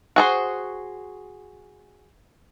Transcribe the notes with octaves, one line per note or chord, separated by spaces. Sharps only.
F#4 G#4 C5